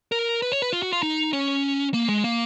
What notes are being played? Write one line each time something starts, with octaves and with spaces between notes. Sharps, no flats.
A#4
B4
C#5
B4
F4
F#4
F4
D#4
C#4
A#3
G#3
A#3